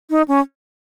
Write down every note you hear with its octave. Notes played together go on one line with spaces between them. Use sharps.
D#4
C#4